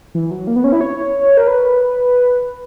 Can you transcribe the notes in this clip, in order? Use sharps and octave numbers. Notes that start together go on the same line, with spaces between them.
E3
F#3
A#3
B3
C#4
E4
C#5
A#4
B4